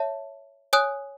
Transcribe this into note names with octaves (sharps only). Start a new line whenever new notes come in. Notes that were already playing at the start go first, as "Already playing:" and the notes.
Already playing: C#5 E5 A5
C#5 G#5 D#6 F#6